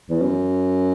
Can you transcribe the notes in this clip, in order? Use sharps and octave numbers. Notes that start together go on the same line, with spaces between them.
E2
F#2